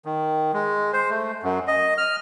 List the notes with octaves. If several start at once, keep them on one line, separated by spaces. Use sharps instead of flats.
D#3
G#3
C5
A3
F#2
D#5
F6